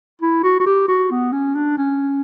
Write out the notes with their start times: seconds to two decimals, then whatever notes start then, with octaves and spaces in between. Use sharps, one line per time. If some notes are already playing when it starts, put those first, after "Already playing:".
0.21 E4
0.44 F#4
0.60 F#4
0.66 G4
0.88 F#4
1.11 B3
1.32 C#4
1.55 D4
1.78 C#4